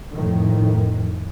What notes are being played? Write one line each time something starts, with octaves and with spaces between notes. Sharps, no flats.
F2 A2 D#3